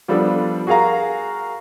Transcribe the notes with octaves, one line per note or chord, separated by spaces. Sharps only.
F3 G3 B3 D4 A4
F#4 G#4 A#4 F5 A#5